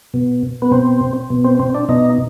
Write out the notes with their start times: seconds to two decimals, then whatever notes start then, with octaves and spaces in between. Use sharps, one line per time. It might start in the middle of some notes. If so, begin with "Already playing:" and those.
0.14 B2
0.62 B3
0.71 B2 C4
1.30 B2
1.44 C4
1.60 C4
1.75 D4
1.89 B2 D#4